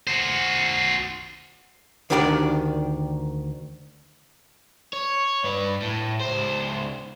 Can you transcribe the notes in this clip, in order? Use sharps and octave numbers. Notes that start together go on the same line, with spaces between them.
F#4 C5
D2 D#3 D4 G4 C5 D5
C#5
G2 B4
A2
C#2 C5